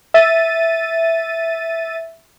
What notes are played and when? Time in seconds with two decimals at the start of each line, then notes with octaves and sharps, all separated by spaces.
0.14 E5 A6 D#7